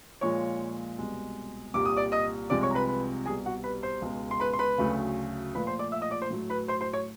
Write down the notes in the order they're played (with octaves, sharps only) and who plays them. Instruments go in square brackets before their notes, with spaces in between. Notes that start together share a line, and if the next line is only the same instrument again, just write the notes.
[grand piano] A#2 F3 G#3 C#5 C#6
C2 B2 G#3
C2 A#2 G3 D6
D#6
D5 D6
D#5 D#6
C2 C3 F3 G#3 D5 D6
C#5 C#6
A#5
B4 B5
B4 B5
C2 B2 G3 G#4 G#5
F#4 F#5
B4 B5
C5 C6
C#2 B2 G#3
C6
B4 B5
C6
B4 B5
D2 C#3 F#3 A3
A#2 F3 A3 B4 B5
C5 C6
D5 D6
E5 E6
D#5 D#6
D5 D6
C5 C6
A2 F#3 A3
B4 B5
C5 C6
C5 C6
C#5 C#6